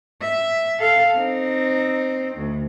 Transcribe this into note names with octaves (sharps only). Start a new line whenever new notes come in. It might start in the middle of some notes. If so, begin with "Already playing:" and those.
E5
A4 F5
C4 D#4
D2